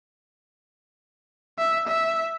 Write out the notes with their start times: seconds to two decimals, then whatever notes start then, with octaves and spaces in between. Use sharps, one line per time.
1.58 E5
1.88 E5